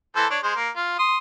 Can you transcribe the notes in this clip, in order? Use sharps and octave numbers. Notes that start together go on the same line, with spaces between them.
E3 A4 C5
D4 C#5
G#3 C5
A#3
F4
C6 D#6